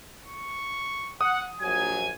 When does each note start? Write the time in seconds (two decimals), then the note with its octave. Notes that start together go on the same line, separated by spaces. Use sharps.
0.24 C#6
1.21 F#5 D#6
1.61 A#1 F#3 G#5 G#6